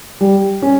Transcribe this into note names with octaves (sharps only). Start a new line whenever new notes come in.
G3
C#4